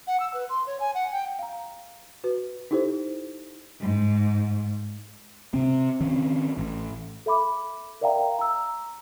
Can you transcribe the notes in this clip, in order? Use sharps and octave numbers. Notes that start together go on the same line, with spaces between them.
F#5
E6
B4
C6
C#5
G#5
F#5
G5
F5 A#5
F#4 B4
D#4 E4 G4 A4 C5
G#2
C3 C4
D#3 C4 C#4
A1
A4 E5 B5 D6
A#4 D5 E5 F5 G5 A#5
A#5 E6